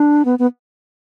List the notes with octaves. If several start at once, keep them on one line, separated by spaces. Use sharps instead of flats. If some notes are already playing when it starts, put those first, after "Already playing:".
Already playing: D4
B3
B3